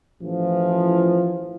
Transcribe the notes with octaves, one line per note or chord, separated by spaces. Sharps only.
A1 E3 F3